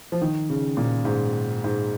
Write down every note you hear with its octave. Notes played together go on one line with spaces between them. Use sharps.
F3
D#3
C#3
A#2
G#2
G#2